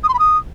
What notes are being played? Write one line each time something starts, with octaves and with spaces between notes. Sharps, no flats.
D#6
C6
B5
D#6